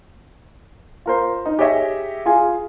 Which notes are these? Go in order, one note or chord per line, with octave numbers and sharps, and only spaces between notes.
F4 A#4 C5
D#4
G4 G#4 C#5 D#5 E5
F4 G#4 G#5